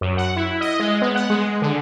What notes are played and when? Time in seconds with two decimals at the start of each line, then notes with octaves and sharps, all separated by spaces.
0.01 F#2
0.17 F#5
0.36 E4
0.61 D#5
0.80 G#3
1.02 B3
1.15 F#5
1.30 G#3
1.62 D3